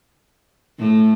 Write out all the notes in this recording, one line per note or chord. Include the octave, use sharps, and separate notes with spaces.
A2 A3